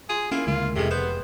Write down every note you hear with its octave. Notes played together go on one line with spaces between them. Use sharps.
F4 G#4
A#3 C#4 E4 F4
D2 C#3 G#3 F4
F1 A2 C3 G#3
B3 C5